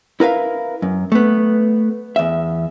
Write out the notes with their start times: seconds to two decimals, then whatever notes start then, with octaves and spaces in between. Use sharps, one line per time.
0.20 E4 A#4 B4 F5
0.82 F#2
1.12 A3 B3
2.16 E2 E5